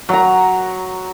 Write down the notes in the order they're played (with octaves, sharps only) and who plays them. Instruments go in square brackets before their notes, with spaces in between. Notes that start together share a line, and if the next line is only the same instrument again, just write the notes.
[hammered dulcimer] F#3 A#5